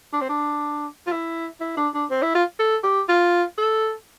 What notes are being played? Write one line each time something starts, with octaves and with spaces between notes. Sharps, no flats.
D4
C4
D4
F4
E4
E4
D4
D4
C4
E4
F4
A4
G4
F4
A4